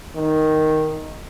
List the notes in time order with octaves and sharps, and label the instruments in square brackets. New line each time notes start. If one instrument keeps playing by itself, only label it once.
[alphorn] D#3